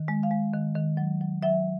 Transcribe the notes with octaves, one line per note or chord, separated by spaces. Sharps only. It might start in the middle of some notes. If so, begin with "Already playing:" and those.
Already playing: D#3
G#3
F5
G#3
D#3
D#3
F#3
F#3
F#3 E5